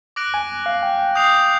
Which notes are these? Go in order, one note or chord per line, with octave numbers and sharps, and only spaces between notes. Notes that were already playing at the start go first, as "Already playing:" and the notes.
D6 F#6 A#6 D7 F#7
G#5
F5
G5
G5
D#6 G6 C7 F7